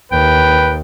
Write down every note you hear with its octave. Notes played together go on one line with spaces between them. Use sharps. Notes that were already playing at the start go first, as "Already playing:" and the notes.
D#2 B4 G5